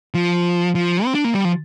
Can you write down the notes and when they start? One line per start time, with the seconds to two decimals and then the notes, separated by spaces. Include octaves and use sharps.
0.14 F3
0.75 F3
1.05 C4
1.15 D4
1.24 A#3
1.34 G3
1.45 F3